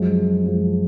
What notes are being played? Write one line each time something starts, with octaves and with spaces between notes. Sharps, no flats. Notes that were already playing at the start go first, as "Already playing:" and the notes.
Already playing: F#2 F3 G#3
F#2 F3 G#3